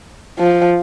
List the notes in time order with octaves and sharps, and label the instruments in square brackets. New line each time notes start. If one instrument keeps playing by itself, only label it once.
[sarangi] F3